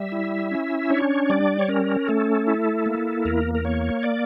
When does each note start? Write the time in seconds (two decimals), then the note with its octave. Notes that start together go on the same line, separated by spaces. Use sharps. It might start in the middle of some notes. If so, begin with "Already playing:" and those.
Already playing: G3 E5
0.12 E4
0.51 C#4
0.90 D4 C#5
1.30 G3 D5
1.59 C#5
1.68 C#4 A#4
2.08 A3 A4
2.47 E4
2.86 A#3
3.25 E2 A#4
3.55 A#4
3.65 A#3 C#5
4.03 D5